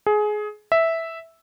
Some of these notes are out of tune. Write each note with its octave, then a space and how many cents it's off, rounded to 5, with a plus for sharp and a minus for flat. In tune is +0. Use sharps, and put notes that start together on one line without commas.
G#4 +20
E5 -5